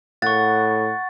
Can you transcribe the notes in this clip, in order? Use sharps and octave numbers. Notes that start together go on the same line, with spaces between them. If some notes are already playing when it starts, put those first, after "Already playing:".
A2 F#5 C#6 A6